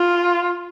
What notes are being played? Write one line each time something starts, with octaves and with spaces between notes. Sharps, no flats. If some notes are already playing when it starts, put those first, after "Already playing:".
Already playing: F4